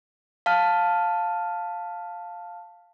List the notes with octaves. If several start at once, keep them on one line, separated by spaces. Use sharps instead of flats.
F5 A5 F6